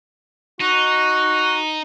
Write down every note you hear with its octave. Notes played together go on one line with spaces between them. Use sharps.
D#4 F#4